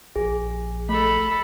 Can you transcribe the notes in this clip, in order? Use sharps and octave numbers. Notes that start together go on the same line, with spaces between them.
A#1 G#4
A3 A4 B5